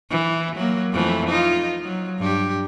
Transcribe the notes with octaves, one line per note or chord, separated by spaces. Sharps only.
E3
F#3 A#3
F2 E3 A3
D#4 F4
F#3
G2 G4